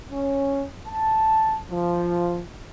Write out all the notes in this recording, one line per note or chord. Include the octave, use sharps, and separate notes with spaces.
C#4
A5
F3